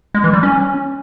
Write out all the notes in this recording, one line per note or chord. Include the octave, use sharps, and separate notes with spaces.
G#3
E3
G3
C#4